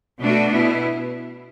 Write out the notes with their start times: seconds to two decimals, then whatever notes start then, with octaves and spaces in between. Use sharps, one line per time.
0.19 B2 A3 D4 F#4
0.51 B2 B3 E4